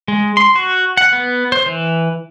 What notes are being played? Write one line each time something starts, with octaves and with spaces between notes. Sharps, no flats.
G#3
C6
F#4
F#5
B3
C5
E3